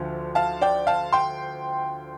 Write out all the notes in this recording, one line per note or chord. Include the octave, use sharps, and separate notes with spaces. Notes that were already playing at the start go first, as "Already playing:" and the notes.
Already playing: D2 D3 F3
F5 A5
D5 G5
F5 A5
G5 C6